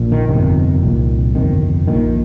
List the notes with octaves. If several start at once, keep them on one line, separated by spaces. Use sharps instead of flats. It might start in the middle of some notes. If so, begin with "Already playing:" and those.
Already playing: A#1 A#2
D#3
G1 F2 C3 D#3
C2 A#2
G1 F2 C3 D#3
A#1 A#2 D#3